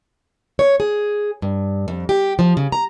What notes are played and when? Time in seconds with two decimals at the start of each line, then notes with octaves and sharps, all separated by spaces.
0.59 C#5
0.80 G#4
1.42 G2
1.88 F2
2.09 G4
2.39 F3
2.57 C#3
2.72 A#5